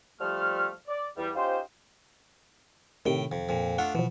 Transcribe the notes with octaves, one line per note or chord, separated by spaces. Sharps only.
F3 G3 A3 F6
D5
E2 G3
C#4 D#4 F4 G4 C5
A2 C3 D#3 G5
F2
F2 A#2
A3 D4 F4 F#5
B2 E3 F3